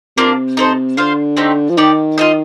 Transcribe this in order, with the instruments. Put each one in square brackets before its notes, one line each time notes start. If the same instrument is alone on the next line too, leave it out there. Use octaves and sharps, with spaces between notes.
[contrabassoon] C3 [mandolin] A#3 D4 F4
[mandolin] D#4 A4 C5
[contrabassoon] D3 [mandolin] F4 C5 F5
[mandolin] A3 C4 D#4 G4
[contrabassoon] F3
[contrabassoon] D#3 [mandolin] D#4 G4 D5
[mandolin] F4 A4 D#5